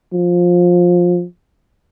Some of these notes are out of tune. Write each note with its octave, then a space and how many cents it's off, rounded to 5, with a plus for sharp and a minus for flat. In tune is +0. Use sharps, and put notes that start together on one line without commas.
F3 +15